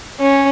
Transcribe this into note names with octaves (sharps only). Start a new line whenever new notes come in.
C#4